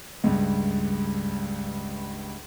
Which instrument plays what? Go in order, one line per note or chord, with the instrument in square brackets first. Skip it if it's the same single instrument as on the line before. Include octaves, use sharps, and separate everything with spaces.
[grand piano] C#2 G2